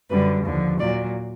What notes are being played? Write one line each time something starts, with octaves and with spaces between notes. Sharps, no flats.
F#2 D3 G3 B4
D#2 D3 F3
A#2 F#3 D5